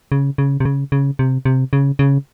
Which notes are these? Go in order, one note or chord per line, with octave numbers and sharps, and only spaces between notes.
C#3
C#3
C3
C#3
C#3
C3
C3
C#3
C#3